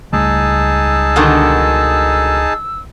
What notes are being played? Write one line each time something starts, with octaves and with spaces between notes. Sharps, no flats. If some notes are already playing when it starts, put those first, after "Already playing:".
C#2 G3 A3 D#4 G#4 A5 E6
B2 D3 D#3